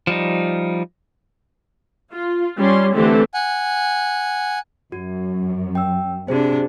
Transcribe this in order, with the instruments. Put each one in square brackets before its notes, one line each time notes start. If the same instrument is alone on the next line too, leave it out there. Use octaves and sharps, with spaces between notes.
[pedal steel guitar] F3 G3 D#4
[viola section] F4
G3 C#4 C6
D3 E3 A3 C4 G4 A4
[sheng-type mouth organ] F#5 G#5
[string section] F#2 [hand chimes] F#4
[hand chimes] G5 E6
[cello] C3 D4 [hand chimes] F#4 G#4 C5